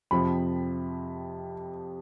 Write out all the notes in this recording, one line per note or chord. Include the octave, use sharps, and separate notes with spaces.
F2 C3 F3 B5